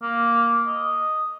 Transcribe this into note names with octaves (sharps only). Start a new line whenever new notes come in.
A#3
D#5